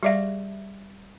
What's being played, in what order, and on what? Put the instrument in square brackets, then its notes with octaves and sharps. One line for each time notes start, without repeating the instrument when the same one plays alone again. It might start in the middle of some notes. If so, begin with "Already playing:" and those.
[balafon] G3 D5 F5 [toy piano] G4 G#4 E5